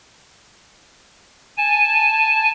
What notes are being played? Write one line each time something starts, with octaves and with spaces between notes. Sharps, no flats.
G#5 A5